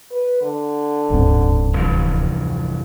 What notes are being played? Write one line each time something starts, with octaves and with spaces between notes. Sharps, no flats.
B4
D3
D#1 A1 D2 G#2 C4
F1 G2 E3